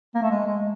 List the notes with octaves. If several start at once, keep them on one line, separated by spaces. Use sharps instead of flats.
A#3
A3
G#3
G#3